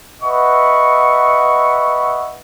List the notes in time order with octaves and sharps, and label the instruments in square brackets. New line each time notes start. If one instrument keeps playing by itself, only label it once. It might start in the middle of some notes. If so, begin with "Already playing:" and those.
[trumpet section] B4 D#5 E5 F#5 C#6